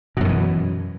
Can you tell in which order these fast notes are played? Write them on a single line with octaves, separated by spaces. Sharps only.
B2 F#2 D3 E3